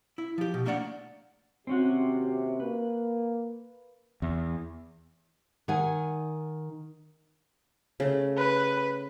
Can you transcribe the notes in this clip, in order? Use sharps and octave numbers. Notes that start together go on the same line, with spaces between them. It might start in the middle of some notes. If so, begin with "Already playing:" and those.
E4
F3 G4
B2
A3 A#3 D4 D5 E5 F#5
D#2 C3 C4 C#4 F#4
A#3 B4
E2
D#3 F#5 G#5
C#3 A3
B4